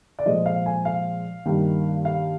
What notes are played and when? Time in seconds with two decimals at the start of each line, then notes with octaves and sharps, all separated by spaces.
0.19 D5
0.26 A#2 F3 G#3 D#5
0.46 F5
0.66 G#5
0.85 F5
1.46 G2 D#3 A#3
2.05 F5